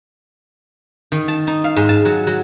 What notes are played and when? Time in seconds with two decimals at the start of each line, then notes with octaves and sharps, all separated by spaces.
1.12 D#3
1.28 A5
1.47 D#4
1.64 F5
1.76 G#2
1.89 A5
2.05 F#3
2.27 F#3